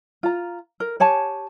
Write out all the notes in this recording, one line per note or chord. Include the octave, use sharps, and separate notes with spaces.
F4 A#5
A#4
G4 C#5 G#5 A5